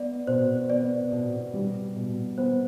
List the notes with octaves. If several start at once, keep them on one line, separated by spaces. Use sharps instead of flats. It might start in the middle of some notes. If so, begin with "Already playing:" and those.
Already playing: B3 D5
B2 C5
B3 D5
B2
G3
B2
B3 C5